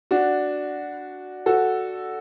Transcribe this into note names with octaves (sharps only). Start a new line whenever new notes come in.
D4 F#4
F#4 A4